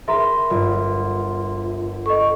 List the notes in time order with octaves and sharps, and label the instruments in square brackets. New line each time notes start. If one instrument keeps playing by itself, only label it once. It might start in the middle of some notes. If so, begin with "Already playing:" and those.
[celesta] G#4 E5 C6 [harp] A#4 B4
[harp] G1 [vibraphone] F4
[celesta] A4 D#5 [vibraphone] C#6